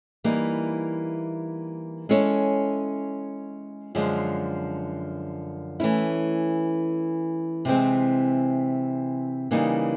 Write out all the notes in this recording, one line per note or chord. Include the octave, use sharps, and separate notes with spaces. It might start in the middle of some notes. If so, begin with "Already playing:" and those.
E3 G3 A#3 D#4
G#3 C#4 E4 A4 C#5
F#2 D3 F3 G#3
E3 A3 C#4 E4
C3 E3 G#3 C4
C#3 E3 G3 A#3 D#4